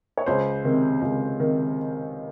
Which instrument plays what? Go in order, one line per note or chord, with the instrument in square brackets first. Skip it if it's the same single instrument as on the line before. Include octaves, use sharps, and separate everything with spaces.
[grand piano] C#5
C#2 C5
C3 D#3
C#2
C3 D#3